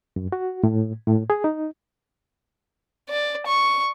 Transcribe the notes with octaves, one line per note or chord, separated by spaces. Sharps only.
F#2
F#4
A2
A2
G#4
D#4
D5
C#6